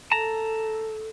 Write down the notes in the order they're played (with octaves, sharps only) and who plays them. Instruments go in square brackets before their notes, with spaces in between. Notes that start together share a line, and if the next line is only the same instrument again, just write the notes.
[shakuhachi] A4 [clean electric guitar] A5 A#5